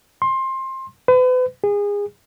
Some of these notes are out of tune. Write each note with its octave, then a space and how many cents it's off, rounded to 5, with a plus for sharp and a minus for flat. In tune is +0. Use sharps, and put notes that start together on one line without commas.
C6 +20
B4 +40
G#4 -25